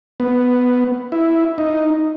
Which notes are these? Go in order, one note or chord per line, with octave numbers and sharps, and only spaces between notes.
B3
E4
D#4